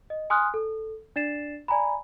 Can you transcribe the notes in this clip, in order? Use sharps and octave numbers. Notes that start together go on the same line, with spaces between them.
D#5
G#5 C6 D#6 F6 F#6
A4
D4 D5 A6 C7 E7
D5 G#5 A#5 B5